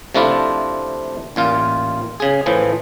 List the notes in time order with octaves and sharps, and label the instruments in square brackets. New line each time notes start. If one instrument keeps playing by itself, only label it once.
[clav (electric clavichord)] C3 F3 A3 D4 E4 F4
A1 A#2 F4
C#3 G#4
A2 E3 F3